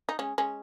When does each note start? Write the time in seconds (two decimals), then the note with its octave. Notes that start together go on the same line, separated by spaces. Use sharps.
0.09 D#4
0.19 G#3 C#4
0.38 G#3 C#4